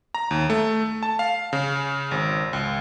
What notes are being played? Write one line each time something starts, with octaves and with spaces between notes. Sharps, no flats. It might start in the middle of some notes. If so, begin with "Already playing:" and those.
A#5
D#2
A3
A5
F5
C#3
G#1
C#2